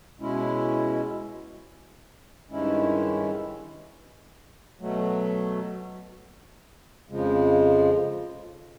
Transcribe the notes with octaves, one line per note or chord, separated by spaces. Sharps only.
B2 G#3 C#4 E4
G2 D#3 G#3 C#4 E4
B2 F#3 A3
F2 C#3 F3 G#3